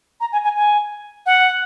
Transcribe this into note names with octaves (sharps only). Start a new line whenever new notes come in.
A#5
G#5
G#5
G#5
F#5